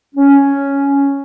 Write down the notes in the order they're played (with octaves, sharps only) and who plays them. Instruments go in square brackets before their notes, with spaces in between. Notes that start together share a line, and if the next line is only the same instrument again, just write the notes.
[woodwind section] C#4